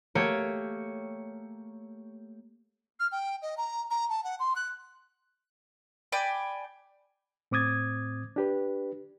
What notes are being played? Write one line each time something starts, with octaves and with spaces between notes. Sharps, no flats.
A3 A#3 G4 C#5
F6
G5
D#5
A#5
A#5
A5
F#5
C6
F#6
D5 G5 G#5 B5
A2 C4 D6 D#6 G#6 A6
D4 G4 B4